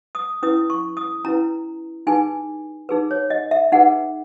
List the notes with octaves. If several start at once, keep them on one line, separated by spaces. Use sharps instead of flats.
D#6
C#4 E4 B4 D#6
C#6
D#6
C#4 E4 B4 A#5
D#4 G#4 B4 G#5
D#4 G#4 B4
C#5
D#5
E5
D#4 G#4 B4 F#5